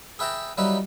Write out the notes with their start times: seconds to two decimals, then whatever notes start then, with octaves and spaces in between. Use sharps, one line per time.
0.19 G#4 B4 E5 G5 A5 A#5
0.57 F#3 G3 A#3 D#4 E4 B4